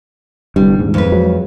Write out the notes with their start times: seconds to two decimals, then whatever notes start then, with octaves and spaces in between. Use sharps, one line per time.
0.56 G1 C2 G2 G3
0.79 D#1 G#2
0.94 F2 B4
1.12 F#3 G#3